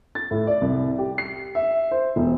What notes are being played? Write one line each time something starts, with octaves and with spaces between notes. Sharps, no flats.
A6
A2
D5
C2
G4
C7
E5
C5
E1